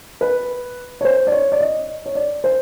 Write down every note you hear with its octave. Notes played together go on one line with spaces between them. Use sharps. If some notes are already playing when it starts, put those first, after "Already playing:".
B4
C#5
C5
D5
C#5
D5
D#5
C#5
D5
C5